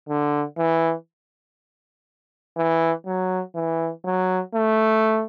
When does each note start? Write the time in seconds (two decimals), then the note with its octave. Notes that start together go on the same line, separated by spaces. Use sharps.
0.09 D3
0.58 E3
2.57 E3
3.07 F#3
3.56 E3
4.06 F#3
4.55 A3